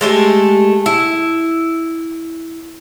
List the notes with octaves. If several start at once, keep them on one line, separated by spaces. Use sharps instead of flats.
G#3 A3 G4 G#5
E4